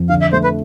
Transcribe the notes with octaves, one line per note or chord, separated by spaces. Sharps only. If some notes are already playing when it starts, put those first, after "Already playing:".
Already playing: F2
D3 F5
E5
A3 C5
B4